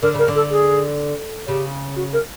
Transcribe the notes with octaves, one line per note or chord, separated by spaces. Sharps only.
D3 A#4
C#3 A#4
D3
A4
G#4
C#3 G4
F#4
A#4